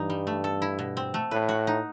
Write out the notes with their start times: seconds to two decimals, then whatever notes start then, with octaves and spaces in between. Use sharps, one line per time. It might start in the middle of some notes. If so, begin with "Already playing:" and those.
Already playing: G2 E3 D#4
0.10 G3
0.27 A3
0.44 A4
0.62 E4
0.79 B2
0.97 C4
1.14 A3
1.31 A2 B4
1.49 F#4
1.67 D#4